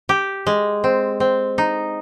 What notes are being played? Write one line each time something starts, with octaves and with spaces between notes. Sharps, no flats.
G4
G#3
C4
C4
D#4